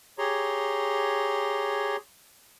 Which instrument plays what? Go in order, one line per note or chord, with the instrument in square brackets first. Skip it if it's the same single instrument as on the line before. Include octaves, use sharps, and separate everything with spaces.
[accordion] G4 G#4 C#5 A#5 C6